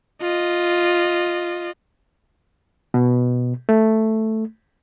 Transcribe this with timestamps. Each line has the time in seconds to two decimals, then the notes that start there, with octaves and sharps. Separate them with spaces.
0.22 F4 D#5
2.94 B2
3.69 A3